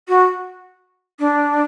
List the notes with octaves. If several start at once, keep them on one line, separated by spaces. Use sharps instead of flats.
F#4
D4